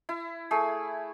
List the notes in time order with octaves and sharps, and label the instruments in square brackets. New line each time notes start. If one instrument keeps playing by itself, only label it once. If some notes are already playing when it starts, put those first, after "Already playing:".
[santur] E4
A3 G#4